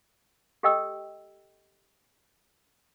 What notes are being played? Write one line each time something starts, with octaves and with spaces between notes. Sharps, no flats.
G4 A4 D#5 G5 E6